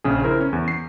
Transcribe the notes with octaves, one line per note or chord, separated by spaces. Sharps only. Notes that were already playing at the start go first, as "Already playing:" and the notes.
A#1 C#3 G#4
E4 A#4 C5
C#4
E2
C7